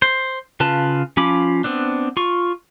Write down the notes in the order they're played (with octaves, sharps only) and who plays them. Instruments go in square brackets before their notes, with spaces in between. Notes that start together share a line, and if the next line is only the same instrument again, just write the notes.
[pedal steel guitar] C5
C#3 F4 B4 A5
F3 C#4 F4 B5 D6
B3 C4 D4
F4 C#6